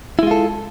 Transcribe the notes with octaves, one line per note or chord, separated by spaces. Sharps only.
G#3 E4 F4 A4